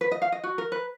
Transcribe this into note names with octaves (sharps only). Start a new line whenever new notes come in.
B4
D#5
F5
D#5
F#4
A#4
B4